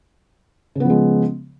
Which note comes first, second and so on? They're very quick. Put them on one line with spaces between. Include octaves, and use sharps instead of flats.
C#3 B3 F3 G#3